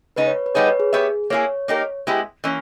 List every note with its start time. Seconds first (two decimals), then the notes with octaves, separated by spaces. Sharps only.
0.16 C#3 G#3 B3 D#4 B4
0.27 C#5
0.46 B4
0.55 G3 B3 D#4 G#4 C#5
0.67 B4
0.80 G#4
0.93 B3 G4 C#5 E5
1.30 A#3 E4 G#4 C#5
1.68 A#3 D#4 G4 A#4
2.07 G#3 B3 E4 G4
2.44 E3 A#3 C#4